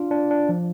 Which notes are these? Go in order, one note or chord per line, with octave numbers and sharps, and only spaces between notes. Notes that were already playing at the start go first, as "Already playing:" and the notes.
Already playing: D4 F4
D4
D4
F3